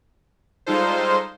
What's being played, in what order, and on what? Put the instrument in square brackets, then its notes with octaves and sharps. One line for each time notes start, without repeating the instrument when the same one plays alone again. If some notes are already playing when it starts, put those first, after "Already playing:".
[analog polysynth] G3 G#3 D#4 F4 A4 C5